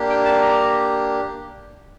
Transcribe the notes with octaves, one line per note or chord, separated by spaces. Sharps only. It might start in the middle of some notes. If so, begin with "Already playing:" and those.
Already playing: A#3 D4 G4
G5
A5
A#5